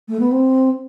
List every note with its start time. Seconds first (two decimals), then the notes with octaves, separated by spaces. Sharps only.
0.08 A3
0.20 B3
0.31 C4